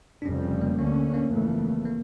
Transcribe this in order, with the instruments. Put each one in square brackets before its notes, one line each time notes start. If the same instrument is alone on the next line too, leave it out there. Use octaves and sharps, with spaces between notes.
[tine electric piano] D4
[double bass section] F1 F2 C#3 G3 [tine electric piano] C#4
[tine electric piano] C#4
A#3
[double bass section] D2 D3 A3 C#4 [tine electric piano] A#3
[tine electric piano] A#3
[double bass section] G1 F2 C#3 E3 A3
[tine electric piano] A#3